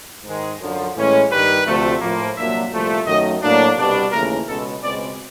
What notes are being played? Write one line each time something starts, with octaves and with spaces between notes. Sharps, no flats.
G#2 D#3 G#3
F#2 D3 F3
A2 E3 G#3 C#4
G2 D#3 G3 B4
D2 C3 F3 A3
A2 F3 A#3
C2 A#2 F#3 A#3 D4 E5
C2 A#2 F3 A3
F#2 D#3 F#3 A3 D#5
A2 F#3 A#3 D4
C2 B2 G3 B3 D4
D#2 C#3 E3 A3 A#4
C#2 B2 G#3 C#4 A4
C#2 B2 G#3 C4 D5